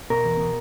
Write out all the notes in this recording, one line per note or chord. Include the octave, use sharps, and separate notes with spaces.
B2 A#4
E2
B2